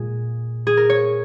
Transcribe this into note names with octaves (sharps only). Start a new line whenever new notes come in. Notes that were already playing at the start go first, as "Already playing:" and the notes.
Already playing: A#2 G#3 G#4
G#4
A#4
C#5